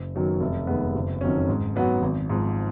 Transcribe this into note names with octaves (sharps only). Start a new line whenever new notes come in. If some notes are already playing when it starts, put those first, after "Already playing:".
Already playing: F#1
F#2 D#3 F#3 B3
F1
D#2 D#3 G#3 B3
F#1
F2 D#3 F#3 C#4
G#2
F#3 B3 F#4
G#1
G#2 F3